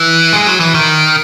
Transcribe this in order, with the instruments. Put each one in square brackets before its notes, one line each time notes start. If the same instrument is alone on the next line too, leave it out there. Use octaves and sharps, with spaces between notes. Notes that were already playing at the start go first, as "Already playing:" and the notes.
Already playing: [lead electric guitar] E3
G#3
F#3
E3
D#3